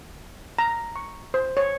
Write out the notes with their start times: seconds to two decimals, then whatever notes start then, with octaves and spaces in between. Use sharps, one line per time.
0.58 A#5
0.96 C#6
1.34 C5
1.57 C#5